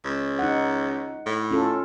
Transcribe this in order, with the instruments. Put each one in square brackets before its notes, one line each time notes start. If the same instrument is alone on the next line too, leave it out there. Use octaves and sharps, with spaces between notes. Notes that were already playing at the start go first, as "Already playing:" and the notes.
[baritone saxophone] C#2
[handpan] D#4 F#5
[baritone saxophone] A2
[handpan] C#4 F4 A4